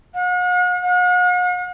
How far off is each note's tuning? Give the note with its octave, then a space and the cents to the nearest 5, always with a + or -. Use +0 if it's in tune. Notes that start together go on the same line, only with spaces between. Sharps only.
F#5 -45
F#5 -45